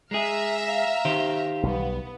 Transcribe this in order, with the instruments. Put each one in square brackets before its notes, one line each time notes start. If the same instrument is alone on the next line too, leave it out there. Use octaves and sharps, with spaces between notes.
[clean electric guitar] G#3 G#4 [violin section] E5 A#5 F6
[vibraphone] F5
[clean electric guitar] D#3 G4 C5
[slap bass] B1 G3 [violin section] B3